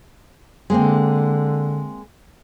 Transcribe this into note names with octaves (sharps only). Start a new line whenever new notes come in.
D3 G#3 A#3 C4